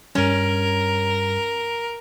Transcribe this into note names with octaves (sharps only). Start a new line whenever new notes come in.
G2 G3 C#4 A#4